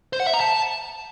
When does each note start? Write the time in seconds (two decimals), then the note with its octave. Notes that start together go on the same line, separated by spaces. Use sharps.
0.13 C5
0.20 F#5
0.27 E5
0.33 A#5
0.40 A5